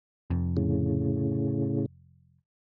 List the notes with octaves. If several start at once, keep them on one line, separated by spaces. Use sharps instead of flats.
F1 F2
A2 C#3